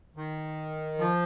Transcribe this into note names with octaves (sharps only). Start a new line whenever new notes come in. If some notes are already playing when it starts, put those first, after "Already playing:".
D#3
F3